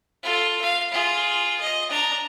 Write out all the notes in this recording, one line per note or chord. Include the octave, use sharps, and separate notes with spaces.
F4 A4
F5
F4 G#4
D#5
D4 A#5